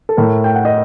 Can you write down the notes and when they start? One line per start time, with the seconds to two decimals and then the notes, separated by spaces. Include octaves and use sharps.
0.09 A4
0.17 A2 A3 A#4
0.44 G5
0.55 F#5
0.65 D#5